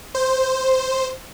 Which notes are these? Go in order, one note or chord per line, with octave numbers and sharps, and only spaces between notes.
C5